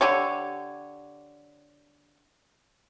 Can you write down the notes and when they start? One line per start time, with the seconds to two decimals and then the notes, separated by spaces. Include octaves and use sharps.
0.01 D3 G4 C#5